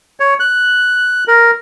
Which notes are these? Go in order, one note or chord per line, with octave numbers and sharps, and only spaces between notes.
C#5
F#6
A#4